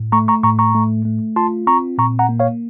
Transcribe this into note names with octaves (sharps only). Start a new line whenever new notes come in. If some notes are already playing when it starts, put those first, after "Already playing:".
Already playing: A2
A3 A#5 C#6
A#5 C#6
A2 A#5 C#6
A#5 C#6
A3
A3
F4 A5 C6
C4 A#5 C#6
A#2 A#5 C#6
F#5 A#5
A#3
C#5 F5